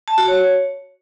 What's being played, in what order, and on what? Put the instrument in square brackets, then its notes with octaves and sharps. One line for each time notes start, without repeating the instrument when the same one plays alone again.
[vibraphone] A5
F#4
C#5